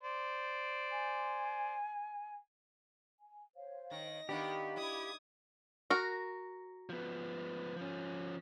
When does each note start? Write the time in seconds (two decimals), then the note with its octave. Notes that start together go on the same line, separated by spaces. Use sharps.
0.03 C5 D5
0.91 G#5
3.19 G#5
3.56 C5 C#5 F5
3.91 D#3 A#6
4.29 D#3 B3 D4 G4 F5 B5 D6
4.77 E4 D#6 G#6
5.90 F#4 A#4
6.89 F3 B3
7.77 F3 C#4